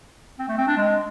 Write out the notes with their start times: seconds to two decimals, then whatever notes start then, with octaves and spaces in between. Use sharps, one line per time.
0.39 C4
0.49 A3
0.58 C4
0.67 D4
0.77 G#3